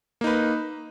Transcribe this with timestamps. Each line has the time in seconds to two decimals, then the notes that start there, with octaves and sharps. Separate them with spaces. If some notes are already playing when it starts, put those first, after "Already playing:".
0.21 A#3
0.24 D#4
0.27 B4